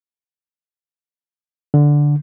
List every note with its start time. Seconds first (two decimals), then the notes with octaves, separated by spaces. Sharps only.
1.74 D3